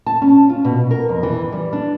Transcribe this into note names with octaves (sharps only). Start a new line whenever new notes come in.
A5
C#4
F4
B2
A#4
F2
E3
G3
D4